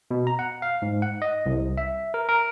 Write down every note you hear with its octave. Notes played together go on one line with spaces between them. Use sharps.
B2
A#5
F#5
F5
G#2
F#5
D#5
C2
E5
A#4
A#4